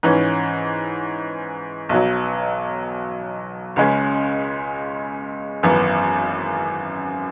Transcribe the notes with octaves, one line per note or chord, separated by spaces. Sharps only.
G#2 E3 C#4
B1 B2 F#3
C#2 C#3 G#3 C#4
G#1 F#2 E3 B3